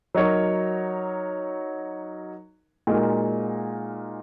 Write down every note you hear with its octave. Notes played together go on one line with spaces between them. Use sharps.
F#3 D#4 F#4 A#4 C#5
A#2 G#3 D#4 F#4 A#4